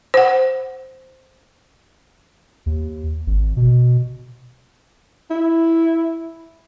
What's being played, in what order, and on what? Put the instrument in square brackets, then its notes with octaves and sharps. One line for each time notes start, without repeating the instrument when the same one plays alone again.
[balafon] C5 F#5
[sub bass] D#2
G#1
B2
[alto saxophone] E4